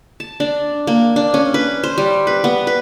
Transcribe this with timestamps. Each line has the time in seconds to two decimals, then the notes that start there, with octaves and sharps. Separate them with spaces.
0.20 A5
0.40 D4
0.87 A#3
1.16 D4
1.34 C#4
1.54 B4
1.84 C5
1.98 G3
2.27 B4
2.44 B3
2.67 B4